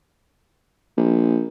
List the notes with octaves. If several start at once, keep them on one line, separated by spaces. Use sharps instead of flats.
A#1